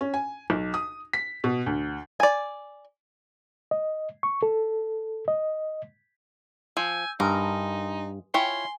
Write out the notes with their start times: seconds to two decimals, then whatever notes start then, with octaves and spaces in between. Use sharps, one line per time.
0.01 C#4
0.14 G#5
0.50 B1
0.74 D#6
1.13 B6
1.44 B2
1.66 D2
2.20 D5 G#5
3.71 D#5
4.23 C#6
4.43 A4
5.28 D#5
6.77 F3 G#5 E6 G6
7.20 G2 D#4 A#4 G#5 C6 D#6
8.34 E4 F4 C#5 G5 G#5 C6